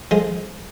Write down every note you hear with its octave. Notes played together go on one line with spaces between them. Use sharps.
F3 G#3